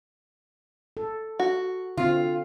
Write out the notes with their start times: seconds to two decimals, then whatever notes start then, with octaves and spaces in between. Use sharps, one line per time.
0.97 A4
1.39 F#4
1.97 D3 C4 F4